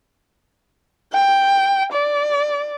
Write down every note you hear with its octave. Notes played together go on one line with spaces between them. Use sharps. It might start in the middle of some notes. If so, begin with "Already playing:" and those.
G5
D5